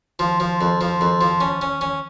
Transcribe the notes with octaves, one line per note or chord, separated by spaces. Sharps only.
F3
F3
F2
F3
F2
F3
C#4
C#4
C#4